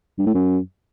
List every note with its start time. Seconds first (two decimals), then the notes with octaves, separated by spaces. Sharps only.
0.18 G2
0.26 A2
0.34 F#2